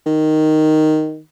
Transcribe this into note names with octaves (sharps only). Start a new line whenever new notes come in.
D#3